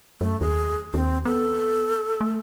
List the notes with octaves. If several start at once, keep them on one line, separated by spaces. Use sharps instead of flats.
F#2 A3
D#2 G#4
D#2 C4
B3 A4
A3